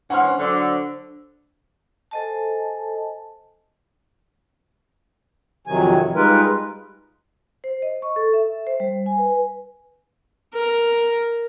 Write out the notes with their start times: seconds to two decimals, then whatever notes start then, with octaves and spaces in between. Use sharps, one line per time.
0.10 E3 C#4 D4 C5 F#5 C6 F6
0.38 D3 F#3 D5
2.11 A4 C5 D#5 G#5 A5
5.67 F2 C3 D#3 F#3 G#5
6.15 G3 G#3 D#4 F4 A#4 B4
7.64 C5
7.82 D#5
8.02 C#6
8.16 A4
8.33 E5
8.67 C5
8.80 G3
9.06 G#5
9.18 B4
10.54 A#4